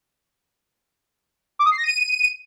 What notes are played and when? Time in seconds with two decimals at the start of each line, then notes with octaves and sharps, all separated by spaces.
1.59 D6
1.65 D#6
1.71 C7
1.78 A#6
1.84 D#7